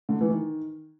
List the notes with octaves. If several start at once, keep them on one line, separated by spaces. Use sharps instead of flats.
D3
E3
D#3